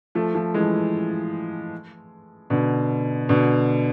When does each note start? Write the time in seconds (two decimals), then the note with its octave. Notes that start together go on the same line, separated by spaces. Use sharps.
0.15 F3 A3
0.34 F3 A3
0.54 E3 G#3
2.50 B2 D3
3.29 B2 D3